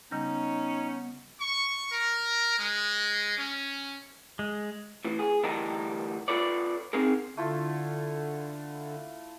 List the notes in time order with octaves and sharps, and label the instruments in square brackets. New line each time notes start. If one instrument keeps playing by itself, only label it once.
[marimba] C#3 G3 G6 [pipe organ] B3 [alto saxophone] C#4 [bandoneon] D#4
[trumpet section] C#6
A#4
G#3
C#4
[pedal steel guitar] G#3
[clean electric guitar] A2 E3
G#4
D2 E3 G3 A4 A#4 D#5
F4 A4 B4 C#5 D5
C4 D#4 G#4 A#4
[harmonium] D3 [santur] A3 E4 F4